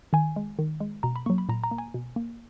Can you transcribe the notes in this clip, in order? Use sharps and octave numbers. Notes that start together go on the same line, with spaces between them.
D#3 G#5
G#3
D#3
G#3
B2 A#5
B5
F#3 A#3 C#6
B5
A#2 A#5
A#5
A#3
G#5
B2
A#3